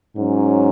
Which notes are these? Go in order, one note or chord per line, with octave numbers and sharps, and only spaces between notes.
G#2 F#3 C#4